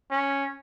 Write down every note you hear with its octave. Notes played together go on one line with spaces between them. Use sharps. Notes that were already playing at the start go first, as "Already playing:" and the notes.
C#4